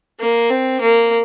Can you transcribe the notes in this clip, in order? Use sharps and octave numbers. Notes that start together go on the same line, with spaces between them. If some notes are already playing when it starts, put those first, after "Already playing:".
A#3
C4
A#3